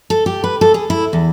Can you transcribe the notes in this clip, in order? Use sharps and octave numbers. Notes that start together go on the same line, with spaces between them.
A4
G4
B4
A4
G#4
E4
E2